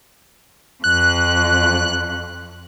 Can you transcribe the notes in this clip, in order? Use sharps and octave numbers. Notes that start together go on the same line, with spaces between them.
F2 F#6